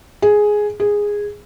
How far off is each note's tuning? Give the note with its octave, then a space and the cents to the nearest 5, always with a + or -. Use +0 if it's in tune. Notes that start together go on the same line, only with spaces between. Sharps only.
G#4 +5
G#4 -10